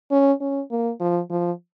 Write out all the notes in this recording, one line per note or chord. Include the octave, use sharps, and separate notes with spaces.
C#4
C#4
A#3
F3
F3